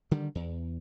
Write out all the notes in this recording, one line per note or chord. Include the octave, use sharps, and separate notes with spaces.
D3 D#3 G3
E2